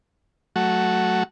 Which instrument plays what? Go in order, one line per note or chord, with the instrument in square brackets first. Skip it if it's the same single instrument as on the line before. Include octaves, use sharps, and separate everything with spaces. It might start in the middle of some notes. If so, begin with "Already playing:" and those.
[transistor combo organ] F#3 A3 F#4